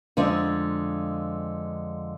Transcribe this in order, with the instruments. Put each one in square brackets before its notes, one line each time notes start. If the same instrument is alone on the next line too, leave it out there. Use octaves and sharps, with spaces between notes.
[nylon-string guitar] F2 D3 G#3 D5